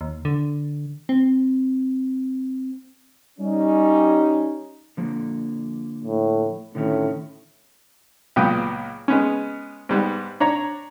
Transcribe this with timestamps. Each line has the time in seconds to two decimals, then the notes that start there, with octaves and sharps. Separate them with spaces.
0.01 D#2
0.25 D3
1.09 C4
3.39 G3 C#4 D#4
4.97 D3 F3 A#3
6.05 A2
6.75 A2 D3 D#3 C#4
8.36 C#2 A#2 F#3 B3 G5 D#6
9.08 G#3 B3 C#4
9.89 G#2 G3 B3
10.40 D4 C#5 A#5